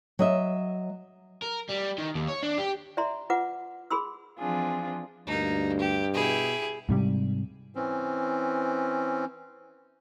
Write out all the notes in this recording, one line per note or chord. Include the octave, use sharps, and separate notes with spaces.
F#3 D#5 E5
A#4
G3
D#3
D#2
C#5
D4
G4
D5 E5 A#5 C6
F4 B4 F#5 D6
G#4 B5 C6 E6
E3 F3 C4 D4 F4 G#4
D2 G2 A#3 D#4
G4
B2 E4 G4 G#4
G#2 C3 G3
E3 C4 C#4